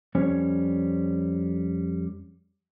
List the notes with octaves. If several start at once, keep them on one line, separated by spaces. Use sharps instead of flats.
F2 G3 C#4 C#5